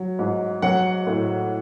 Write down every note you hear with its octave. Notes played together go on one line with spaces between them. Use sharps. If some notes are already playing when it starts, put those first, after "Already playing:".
Already playing: F#3
G#2
F#3 F#5
A2